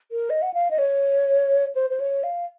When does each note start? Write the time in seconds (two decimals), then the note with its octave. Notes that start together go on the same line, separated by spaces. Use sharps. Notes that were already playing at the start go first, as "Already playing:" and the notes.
0.12 A#4
0.30 D#5
0.42 F#5
0.54 F5
0.71 D#5
0.78 C#5
1.75 C5
1.90 C5
2.00 C#5
2.23 F5